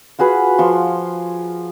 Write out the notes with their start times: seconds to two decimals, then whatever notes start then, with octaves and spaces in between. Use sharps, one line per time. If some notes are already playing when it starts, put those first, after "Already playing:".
0.19 F4 F#4 G#4 B4
0.58 F3 C6 C#6